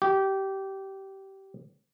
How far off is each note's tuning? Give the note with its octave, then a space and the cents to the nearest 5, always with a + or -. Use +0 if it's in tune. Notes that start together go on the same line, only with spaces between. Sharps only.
G4 -20